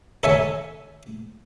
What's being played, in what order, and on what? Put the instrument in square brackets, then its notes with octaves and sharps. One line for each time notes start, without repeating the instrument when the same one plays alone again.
[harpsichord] A4 C#5 E5 G#5